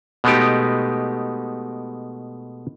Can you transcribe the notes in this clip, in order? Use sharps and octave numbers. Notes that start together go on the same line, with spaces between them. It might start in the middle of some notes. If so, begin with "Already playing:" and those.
B2 G#3 A3 B3 D#4 G4